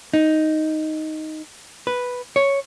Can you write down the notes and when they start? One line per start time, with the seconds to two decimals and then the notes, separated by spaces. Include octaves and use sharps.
0.14 D#4
1.87 B4
2.36 C#5